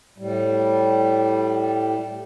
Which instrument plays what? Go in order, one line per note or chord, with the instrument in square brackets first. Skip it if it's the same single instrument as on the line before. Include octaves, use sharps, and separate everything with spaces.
[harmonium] A2 G3